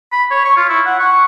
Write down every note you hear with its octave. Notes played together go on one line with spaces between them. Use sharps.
B5
C#5
C#6
F4
E4
F#5
C#6